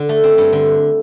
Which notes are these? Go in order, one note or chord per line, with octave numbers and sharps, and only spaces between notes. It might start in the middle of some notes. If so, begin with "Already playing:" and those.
Already playing: D3
A3
C4
G2
D3